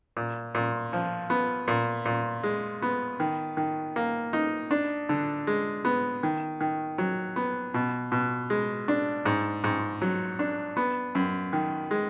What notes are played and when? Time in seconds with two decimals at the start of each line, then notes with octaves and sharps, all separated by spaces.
0.17 A#2
0.55 A#2
0.93 F3
1.30 B3
1.68 A#2
2.06 A#2
2.43 G#3
2.82 B3
3.20 D#3
3.57 D#3
3.96 A#3
4.33 D#4
4.71 D4
5.09 D3
5.47 G#3
5.85 B3
6.23 D#3
6.61 D#3
6.98 F#3
7.36 B3
7.74 B2
8.12 B2
8.50 G#3
8.88 D4
9.26 G#2
9.64 G#2
10.02 F#3
10.39 D4
10.77 B3
11.15 F#2
11.53 D#3
11.91 G#3